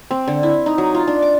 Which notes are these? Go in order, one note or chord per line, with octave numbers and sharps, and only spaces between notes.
C4
D3
E4
D#4
F#3
F4
D4
D6